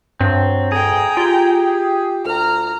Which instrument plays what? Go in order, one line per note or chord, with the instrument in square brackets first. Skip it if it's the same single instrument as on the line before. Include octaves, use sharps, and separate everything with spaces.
[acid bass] G2 [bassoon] F#3 [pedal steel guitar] C4
[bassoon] D2 [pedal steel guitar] G#4 [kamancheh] G5 A#5
[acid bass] F4 [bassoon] G4
[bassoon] D2 [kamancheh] A#5 F6